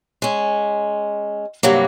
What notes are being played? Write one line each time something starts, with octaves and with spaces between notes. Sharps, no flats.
G#3 C#4
G2 C3 F#3 G3 A#3